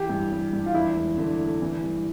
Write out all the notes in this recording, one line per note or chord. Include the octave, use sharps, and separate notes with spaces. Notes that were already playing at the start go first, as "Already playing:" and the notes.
Already playing: E3 G4
G2
G3
G2
F4
E2 E4
E1
D3
A3
E3
G2